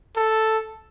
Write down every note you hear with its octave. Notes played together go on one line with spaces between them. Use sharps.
A4